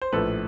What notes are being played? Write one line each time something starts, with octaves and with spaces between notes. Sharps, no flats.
C5
A#1 A2 F3 A4 B4